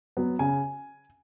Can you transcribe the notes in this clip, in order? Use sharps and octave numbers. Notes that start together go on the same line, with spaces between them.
F#3 B3
C#3 G#5